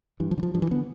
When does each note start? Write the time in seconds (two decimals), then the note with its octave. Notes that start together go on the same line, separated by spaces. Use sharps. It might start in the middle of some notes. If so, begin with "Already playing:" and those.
0.20 G2 E3
0.31 F3
0.38 D3
0.43 F3
0.54 G2 F3
0.62 E3
0.71 D3 B3